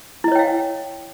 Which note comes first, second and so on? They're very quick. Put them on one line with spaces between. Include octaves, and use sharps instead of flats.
E4 D#5 C#5 G5 F5